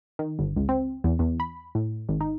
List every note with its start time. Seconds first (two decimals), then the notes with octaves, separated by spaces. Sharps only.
0.19 D#3
0.39 G1
0.56 C#2
0.69 C4
1.04 E2
1.19 E2
1.40 B5
1.75 A2
2.09 G#1
2.21 D#4